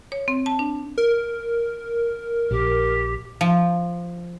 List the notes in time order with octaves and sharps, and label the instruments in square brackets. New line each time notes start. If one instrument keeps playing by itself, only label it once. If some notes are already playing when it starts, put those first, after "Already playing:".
[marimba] C#5
C4
A5
D4
[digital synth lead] A#4
[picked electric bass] A#1 [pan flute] G4
[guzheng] F3